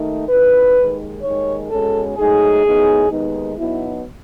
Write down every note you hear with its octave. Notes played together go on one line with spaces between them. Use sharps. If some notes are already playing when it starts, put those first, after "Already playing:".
Already playing: D#2 D#3 A3 D#4
D#2 C#3 E3 B4
D#2 D#3 G#3
D#2 D#3 G#3 C#5
B2 G#3 C#4 A4
G#2 F#3 A3 D#4 G#4
A2 F#3 B3 D#4
D#2 D#3 G#3 B3 D#4
B2 F#3 B3 D#4 E4